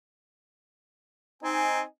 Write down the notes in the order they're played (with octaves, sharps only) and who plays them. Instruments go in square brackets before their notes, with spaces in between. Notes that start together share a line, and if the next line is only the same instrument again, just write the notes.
[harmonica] C4 [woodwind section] D#4 G#5